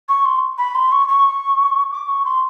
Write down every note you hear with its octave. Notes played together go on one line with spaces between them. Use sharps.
C#6
C6
B5
C6
C#6
C#6
D6
C#6
C6